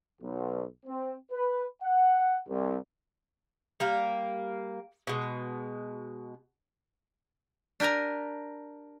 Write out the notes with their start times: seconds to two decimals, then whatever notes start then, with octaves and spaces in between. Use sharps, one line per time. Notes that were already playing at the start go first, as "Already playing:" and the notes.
0.22 B1
0.86 C4
1.31 B4
1.83 F#5
2.48 C2
3.80 G3 A#3 F5
5.07 B2 G#3
7.80 D4 G4 A#4 G#5 A#5